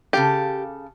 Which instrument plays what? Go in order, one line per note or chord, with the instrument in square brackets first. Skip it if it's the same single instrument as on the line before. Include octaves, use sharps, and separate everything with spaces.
[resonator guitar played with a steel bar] C#3 A4 F5 [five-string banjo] G4